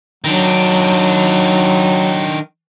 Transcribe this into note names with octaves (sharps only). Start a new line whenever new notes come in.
D#3 F#3 D4